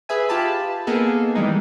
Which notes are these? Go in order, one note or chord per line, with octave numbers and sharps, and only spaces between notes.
G#4 B4 E5 G#5
F4 G4 A5 B5
A#3 B3 D#4 G#4 A4
E3 G3 G#3 D#4